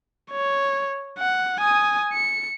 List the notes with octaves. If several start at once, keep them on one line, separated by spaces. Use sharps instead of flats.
C#5
F#5
G#5 D#6
C#7